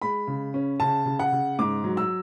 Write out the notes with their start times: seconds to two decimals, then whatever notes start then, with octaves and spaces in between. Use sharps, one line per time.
0.02 G#3 B5
0.27 C#3
0.54 C#4
0.80 C#3 A5
1.06 C#3
1.19 F#5
1.32 C#3
1.59 G#2 D6
1.84 F#3
1.97 E6